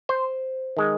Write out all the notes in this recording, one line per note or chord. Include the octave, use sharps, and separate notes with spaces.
C5
D#3 G#3